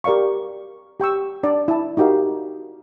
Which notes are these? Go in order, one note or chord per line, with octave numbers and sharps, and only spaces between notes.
G4 A#4 D5 F5 C#6
G4 G5 C#6 E6
D4 D5
E4 A5
D#4 F#4 G4 A#4 F5